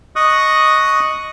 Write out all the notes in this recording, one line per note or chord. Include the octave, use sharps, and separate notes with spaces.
D#5 C#6 D#6 F#6